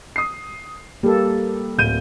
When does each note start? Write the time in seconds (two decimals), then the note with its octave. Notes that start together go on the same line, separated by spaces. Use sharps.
0.16 D#6 C7
1.03 G3 A#3 A4
1.78 D1 G6 D#7